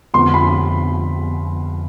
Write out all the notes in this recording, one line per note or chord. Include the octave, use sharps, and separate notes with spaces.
F2 D3 F3 G#3 B3 C6
B5